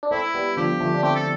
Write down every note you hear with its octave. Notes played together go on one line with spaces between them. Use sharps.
D4
A3 C4 E4
G3 B3
D3 F3 G4
F3 A3
D4
A3 C4 G4
A4